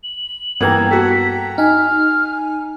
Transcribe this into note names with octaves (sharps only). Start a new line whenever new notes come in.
F#7
G2 E3 A#3 B3 G5 A#5 G#6
F#4 A4 B6
D#4 G#5 F6